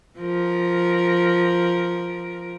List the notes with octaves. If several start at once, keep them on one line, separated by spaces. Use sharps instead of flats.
F3 A#4